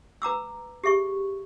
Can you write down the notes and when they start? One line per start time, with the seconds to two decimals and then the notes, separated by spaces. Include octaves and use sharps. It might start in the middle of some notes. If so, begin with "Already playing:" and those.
0.22 B4 A#5 D6 E6
0.84 G4 G#4 E5 C#6